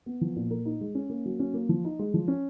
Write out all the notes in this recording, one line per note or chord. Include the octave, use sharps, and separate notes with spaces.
B3
F3
A#2
A#4
D#4
G#3
C#4
A#3
F#3
C#4
A#3
F3
D#4
G#3
F3
C#4